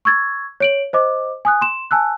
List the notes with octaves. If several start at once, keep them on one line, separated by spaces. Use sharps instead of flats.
C#6 E6 G#6 A6
C#5 D7 F#7
C5 D#5 D6
G#5 D#6 F#6
C6 E7
G#5 A5 E6 F#6